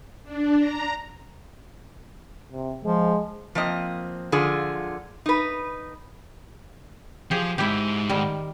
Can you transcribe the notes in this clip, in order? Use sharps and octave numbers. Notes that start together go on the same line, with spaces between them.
D4
A#5
C3
F3 G#3
F3 A#3 C4 D#5
D3 F3 F4 G#4
D#4 B4
F3 G4 G#4
D2 G#2 E4 G4
D#3 G3